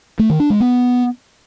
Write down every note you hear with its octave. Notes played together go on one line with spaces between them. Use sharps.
A3
D#3
D4
G#3
B3